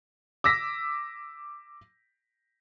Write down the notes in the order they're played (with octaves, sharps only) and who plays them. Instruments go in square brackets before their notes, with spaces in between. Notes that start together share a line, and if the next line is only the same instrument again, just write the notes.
[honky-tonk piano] D6 E6 A#6 B6